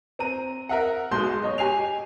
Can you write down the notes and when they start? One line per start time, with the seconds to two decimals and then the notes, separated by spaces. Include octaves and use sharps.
0.19 C4 A#5 D#7
0.69 A#4 E5 F#5
1.11 B1 B2 G#3 C6 G6
1.43 C#5 D#5
1.58 G4 G#5 C7 F7